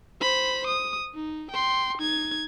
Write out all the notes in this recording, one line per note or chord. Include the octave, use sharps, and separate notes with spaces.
C5 B5
D#6
D#4
G5 C6
D#4 G#6